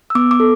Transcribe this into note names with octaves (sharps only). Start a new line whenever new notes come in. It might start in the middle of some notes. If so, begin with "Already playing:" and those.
E6
B3 D6
D6
A4